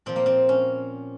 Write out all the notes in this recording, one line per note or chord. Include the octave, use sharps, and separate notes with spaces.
A#2 F3 C4
A#3
C4
C#4